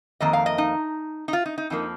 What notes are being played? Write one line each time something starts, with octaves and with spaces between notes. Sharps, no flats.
F2 D#3 A#3 D#5
F5
D#5
D#4
D#4
F4
D#4
D#4
F2 F3 A#3 D#4